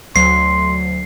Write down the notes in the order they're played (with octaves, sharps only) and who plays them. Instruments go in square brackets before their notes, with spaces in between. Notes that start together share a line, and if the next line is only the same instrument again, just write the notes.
[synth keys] D2 F#3 [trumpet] C6 [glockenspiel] C7